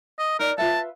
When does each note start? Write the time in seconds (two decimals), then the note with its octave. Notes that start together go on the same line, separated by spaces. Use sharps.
0.19 D#5
0.39 D#4 A#4 D5
0.58 F4 B4 E5 A5